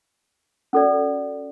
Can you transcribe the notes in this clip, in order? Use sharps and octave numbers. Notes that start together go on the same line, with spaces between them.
C#4 F#4 A4 D5